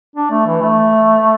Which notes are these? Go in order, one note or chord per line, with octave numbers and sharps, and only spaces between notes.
D4
A3
E3
A3